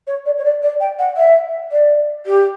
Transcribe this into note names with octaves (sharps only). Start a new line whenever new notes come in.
C#5
D5
C#5
D5
D5
G5
F#5
E5
D5
G4